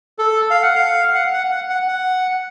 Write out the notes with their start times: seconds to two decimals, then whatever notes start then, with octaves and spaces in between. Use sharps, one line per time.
0.19 A4
0.50 F5
0.63 F#5
0.75 F5
1.15 F#5
1.33 F#5
1.51 F#5
1.70 F#5
1.88 F#5